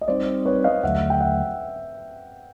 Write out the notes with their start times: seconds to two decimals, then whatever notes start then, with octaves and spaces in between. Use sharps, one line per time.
0.01 D#5
0.08 G3 C4 D#4 C5 D5
0.45 B4 C#5
0.64 D#5 F5
0.83 D#2 D3 F#3 A3 E5 F#5
1.10 G5
1.20 E5 F#5